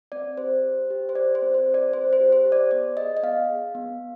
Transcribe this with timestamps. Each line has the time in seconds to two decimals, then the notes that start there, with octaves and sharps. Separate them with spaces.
0.12 C4 D5
0.37 G4 C5
0.64 G4
0.90 G4
1.09 C5
1.15 G4 D5
1.35 C5
1.42 C4
1.54 C5
1.68 G4
1.74 D5
1.93 C4 C5
2.13 C5
2.20 G4
2.32 C5
2.46 G4
2.52 D5
2.71 B3 D5
2.97 G#4 D#5
3.17 D#5
3.23 B3 F5
3.50 G#4
3.75 B3